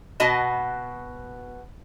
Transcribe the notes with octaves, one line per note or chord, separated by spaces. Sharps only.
B2 B3 F#4 D#5 A5